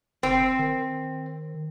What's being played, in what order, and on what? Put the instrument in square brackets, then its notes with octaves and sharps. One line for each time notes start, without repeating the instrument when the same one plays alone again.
[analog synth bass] F#1 [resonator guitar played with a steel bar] C4
[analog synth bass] D#3